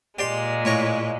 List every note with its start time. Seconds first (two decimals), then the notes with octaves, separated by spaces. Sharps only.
0.19 A#2 G#3 G4 D5 C6
0.65 A2 C#5 A#5